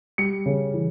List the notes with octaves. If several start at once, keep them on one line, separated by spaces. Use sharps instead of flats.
G3 C#7
C#3
E3